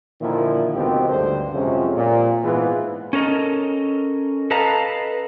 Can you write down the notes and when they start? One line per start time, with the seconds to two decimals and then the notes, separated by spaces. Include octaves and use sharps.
0.20 A#2 D3 D#3 F3 A#3 E4
0.75 C#2 B2 D#3 F3 C4 G4
1.09 D2 G2 D3 C5
1.53 F2 C3 F3 F#3 G#3 C#4
1.95 A#2
2.43 G#2 E3 B3 F4 G#4 B4
3.13 C#4 A4 A#4 D#5
4.51 A4 B4 D#5 F5 A5 A#5